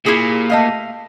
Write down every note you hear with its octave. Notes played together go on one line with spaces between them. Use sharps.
A#2 E4 G4 G#4
A3 D#5 F5